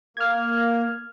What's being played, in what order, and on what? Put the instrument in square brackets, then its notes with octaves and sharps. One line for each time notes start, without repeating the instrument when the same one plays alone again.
[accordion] A#3 [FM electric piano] F6 G#6